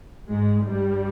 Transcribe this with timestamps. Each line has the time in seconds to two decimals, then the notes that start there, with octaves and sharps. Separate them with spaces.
0.29 G#2 G#3
0.65 G2 G3